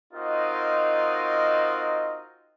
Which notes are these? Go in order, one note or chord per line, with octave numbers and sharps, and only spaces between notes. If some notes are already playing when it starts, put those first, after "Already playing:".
C4 D#4 F4 F#4 A#4 D#5